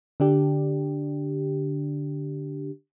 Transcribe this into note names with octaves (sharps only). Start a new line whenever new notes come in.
D3 D4 G4